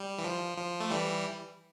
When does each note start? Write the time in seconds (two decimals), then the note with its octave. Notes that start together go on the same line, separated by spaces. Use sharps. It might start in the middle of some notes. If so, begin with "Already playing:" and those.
Already playing: G3
0.18 E3
0.24 F3
0.57 F3
0.80 A3
0.90 E3 G3